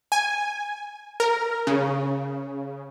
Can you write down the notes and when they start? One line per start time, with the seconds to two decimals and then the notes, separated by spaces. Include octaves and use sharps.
0.12 G#5
1.20 A#4
1.67 C#3